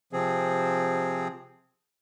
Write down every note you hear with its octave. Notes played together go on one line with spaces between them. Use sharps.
C3 F3 C4 G#4